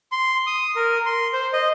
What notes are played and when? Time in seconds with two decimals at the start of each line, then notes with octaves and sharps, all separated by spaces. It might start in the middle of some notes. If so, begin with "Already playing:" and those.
0.12 C6
0.47 D#6
0.76 A#4
1.06 C6
1.33 C5
1.53 D#5